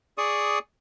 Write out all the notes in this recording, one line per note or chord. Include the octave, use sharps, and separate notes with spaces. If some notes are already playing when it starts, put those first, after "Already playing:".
G#4 D5 C#6 D#6